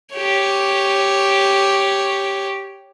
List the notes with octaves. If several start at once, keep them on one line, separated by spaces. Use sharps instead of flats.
G4 C#5